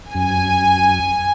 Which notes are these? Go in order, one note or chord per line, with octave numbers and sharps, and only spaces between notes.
F#2 G#5